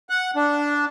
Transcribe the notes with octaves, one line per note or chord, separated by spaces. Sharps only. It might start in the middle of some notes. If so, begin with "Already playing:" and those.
F#5
D4